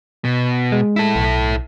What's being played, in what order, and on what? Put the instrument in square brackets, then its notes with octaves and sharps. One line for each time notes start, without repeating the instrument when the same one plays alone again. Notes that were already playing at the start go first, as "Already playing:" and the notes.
[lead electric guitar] B2
[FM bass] G#3
[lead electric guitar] E4 A4
[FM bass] B1